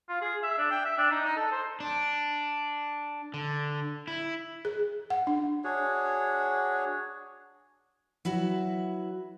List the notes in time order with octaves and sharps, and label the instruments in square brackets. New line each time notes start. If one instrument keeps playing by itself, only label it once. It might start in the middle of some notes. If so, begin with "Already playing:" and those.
[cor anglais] F4
G#4
E5
D4
G5
E5
D4
D#4
D#4
A4
C5
[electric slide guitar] D4
D3
E4
[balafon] G#4
F#5
D4
[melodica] D4 F#4 G#4 C#5
[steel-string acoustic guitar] F#3 E4 F#4 B4